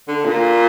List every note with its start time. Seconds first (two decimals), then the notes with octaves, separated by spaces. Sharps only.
0.08 D3
0.25 A#2